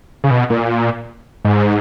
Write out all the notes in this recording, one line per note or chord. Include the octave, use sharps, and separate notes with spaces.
C#3
B2
A#2
G#2